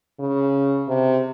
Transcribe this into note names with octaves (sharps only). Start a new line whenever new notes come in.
C#3
C3